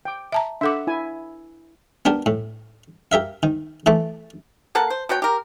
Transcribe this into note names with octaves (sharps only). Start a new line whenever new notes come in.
G5 D6
E5 A5 A#5
D4 A4 E5 F#5 D6
E4 G#5
B3 D4 G4 A#4
A2
G4 A#4 E5 F5
D#3
E3 A3 A5 D6
A#3 A4 F#5 A5
C5
B2 F#4 C#5 G5
G4 A#4